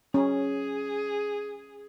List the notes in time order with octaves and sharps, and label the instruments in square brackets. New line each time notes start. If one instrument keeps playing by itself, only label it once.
[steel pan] C#4 [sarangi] G#4